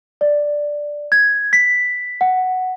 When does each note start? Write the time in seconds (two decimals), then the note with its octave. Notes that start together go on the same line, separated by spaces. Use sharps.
0.21 D5
1.12 G#6
1.53 B6
2.21 F#5